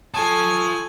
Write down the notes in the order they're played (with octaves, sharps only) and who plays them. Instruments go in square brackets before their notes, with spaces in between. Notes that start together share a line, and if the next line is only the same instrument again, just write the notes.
[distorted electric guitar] F4 A5 [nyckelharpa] A4 [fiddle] G#5 [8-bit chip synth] C#6 D#6